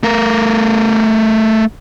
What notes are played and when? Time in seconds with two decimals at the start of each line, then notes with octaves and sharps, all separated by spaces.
0.03 A3 A#4